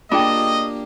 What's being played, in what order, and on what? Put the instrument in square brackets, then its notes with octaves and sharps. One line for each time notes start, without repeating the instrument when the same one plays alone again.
[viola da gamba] A#3 G4 [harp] D4 [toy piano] F4 G#4 G5 [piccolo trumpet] D#5